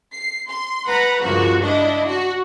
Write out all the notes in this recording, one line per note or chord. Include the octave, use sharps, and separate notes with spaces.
C7
C6
B4 F#5 A#5 B5
C#2 G2 F3 A#3 F#4
D4 E4 D#5
F#4